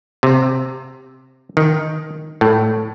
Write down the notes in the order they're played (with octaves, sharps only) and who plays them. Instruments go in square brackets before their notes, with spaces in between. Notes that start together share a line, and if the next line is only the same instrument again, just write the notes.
[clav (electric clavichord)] C3
D#3
A2